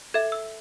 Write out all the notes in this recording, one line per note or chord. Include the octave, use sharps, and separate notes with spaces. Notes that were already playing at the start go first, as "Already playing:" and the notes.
A4 E5 G#6
E6